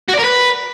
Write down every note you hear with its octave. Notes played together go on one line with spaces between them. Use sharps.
F#4
D5
A#4
B4